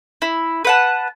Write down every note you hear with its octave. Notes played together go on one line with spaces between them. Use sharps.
E4
B4 F#5 A5